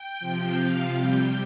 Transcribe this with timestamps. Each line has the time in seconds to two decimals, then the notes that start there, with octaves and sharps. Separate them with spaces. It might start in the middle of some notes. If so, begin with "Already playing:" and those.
Already playing: G5
0.20 C3 F3
0.56 C3 F3 F5
0.92 C3 G3 G5